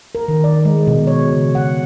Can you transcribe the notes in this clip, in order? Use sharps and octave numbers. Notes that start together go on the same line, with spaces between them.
A#4
D#3
D5
G#3
B2
C#5
C#3
F#5